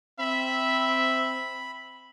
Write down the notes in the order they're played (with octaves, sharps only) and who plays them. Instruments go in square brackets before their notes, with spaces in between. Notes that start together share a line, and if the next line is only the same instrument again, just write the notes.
[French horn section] C4 [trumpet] E5 [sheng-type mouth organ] B5